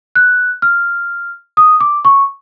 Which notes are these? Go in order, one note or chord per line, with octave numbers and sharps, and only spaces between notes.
F#6
F6
D#6
D6
C#6